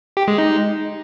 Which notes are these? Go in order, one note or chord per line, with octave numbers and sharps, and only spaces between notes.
G4
G#3
D#4